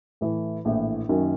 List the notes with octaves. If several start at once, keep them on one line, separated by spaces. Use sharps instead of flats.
A2 E3 A3
A#1 A2 E3
F#2 D#3 F#3 A#3 C#4